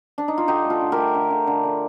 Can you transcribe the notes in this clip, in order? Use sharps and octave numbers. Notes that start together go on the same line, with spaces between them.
D4
D#4
F4
D3 D#4 G4
A3
F4 A4
D3
A3 G4 A#4
D3
D3
D3
D3